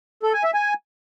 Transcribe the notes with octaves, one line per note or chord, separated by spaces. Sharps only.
A4
G#5
E5
G#5